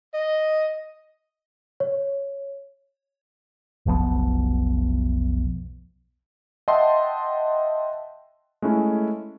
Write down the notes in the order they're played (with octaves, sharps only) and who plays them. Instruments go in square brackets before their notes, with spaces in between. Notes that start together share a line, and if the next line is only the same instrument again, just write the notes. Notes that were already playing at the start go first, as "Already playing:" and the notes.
[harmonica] D#5
[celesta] C#5
[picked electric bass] F1 B1 F3 B3
[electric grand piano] D#5 E5 F#5 G5 A5 C6
G#3 A3 C#4 E4